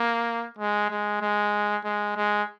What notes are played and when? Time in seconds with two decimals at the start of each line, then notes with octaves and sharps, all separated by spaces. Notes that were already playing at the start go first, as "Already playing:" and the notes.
Already playing: A#3
0.59 G#3
0.90 G#3
1.21 G#3
1.84 G#3
2.17 G#3